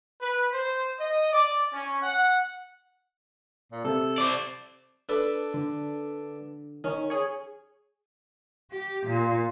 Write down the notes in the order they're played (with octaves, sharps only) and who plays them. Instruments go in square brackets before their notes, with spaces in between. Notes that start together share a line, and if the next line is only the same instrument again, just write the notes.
[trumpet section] B4
C5
D#5
D5
C#4
F#5
[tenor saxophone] A#2
[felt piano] C3 [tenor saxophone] A4
[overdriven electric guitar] C5 D5
[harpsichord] D4 A4 B4
[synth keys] D3
[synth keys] D#3 [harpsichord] C#4
[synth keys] G#4 C#5
[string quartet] G4
A#2